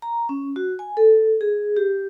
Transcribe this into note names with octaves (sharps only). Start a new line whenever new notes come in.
A#5
C#4
F#4
G#5
A4
G#4
G4